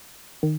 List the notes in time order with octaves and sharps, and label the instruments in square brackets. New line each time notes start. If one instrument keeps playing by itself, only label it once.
[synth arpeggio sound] D#3